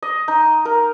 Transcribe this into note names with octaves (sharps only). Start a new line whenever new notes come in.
D#5
D#4
A#4